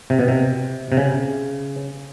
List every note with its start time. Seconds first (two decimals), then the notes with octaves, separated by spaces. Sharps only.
0.10 C3
0.19 B2
0.28 C3
0.92 C3
0.97 C#3